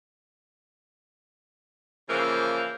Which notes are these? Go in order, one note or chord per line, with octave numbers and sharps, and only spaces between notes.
C#3 E3 F3 A#3